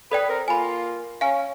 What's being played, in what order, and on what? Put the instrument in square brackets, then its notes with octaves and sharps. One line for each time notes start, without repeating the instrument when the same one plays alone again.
[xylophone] A4 D5 G5 [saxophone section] B4
[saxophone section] C4 A#4
[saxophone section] A#3 F4 [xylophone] G#5 B5
[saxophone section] C#4 [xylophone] F5 G#5